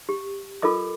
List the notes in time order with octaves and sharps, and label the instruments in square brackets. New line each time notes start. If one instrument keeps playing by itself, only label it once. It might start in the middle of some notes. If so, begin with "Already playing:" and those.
[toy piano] G4
F4 A4 A#4 D#5 D6